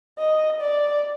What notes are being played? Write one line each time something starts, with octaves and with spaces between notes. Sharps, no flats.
D#5
D5